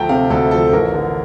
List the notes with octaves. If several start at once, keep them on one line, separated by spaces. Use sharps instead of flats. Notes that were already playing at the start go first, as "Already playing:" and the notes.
Already playing: D2 F3 A3 G5 A5 A#5
C3 F5
D2 A4
F3 A4
A1 A#4
D3